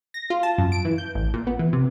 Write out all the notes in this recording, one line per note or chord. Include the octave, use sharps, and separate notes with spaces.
A#6
F4
A5
F#2
D7
E3
G6
A1
A#2
B3
E3
C3